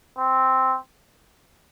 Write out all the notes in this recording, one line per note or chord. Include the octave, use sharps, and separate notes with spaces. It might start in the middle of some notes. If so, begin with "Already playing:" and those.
C4